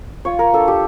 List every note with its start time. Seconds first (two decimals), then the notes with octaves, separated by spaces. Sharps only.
0.25 F4 C#5
0.39 A#4
0.53 D4 A4
0.68 G4